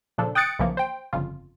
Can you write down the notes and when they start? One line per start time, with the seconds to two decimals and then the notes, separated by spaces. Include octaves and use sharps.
0.18 A#2 C#3 F3 D4 A4
0.35 G5 D#6 F#6 A6 C#7 D7
0.59 B1 C#3 E3 F3 A#3
0.77 C5 G5
1.13 G1 F2 C#3 F4